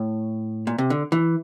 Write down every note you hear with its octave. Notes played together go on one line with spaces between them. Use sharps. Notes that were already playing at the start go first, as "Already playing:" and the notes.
Already playing: A2
A#2
C3
D3
E3